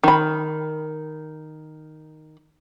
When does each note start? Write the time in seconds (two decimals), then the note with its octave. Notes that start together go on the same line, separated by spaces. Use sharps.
0.04 D#3 B5